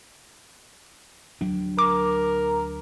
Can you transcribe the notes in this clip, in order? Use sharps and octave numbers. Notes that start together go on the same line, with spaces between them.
D2 F#3 D4
A#4 D6